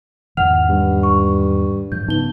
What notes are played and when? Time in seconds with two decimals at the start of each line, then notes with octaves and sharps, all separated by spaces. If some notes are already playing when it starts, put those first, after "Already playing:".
0.37 E2 G#2 D#3 F#5 F6 F7
0.69 G2
1.03 C#6
1.92 G#2 F3 G6
2.08 C#3 F#3 B3 D#4 G7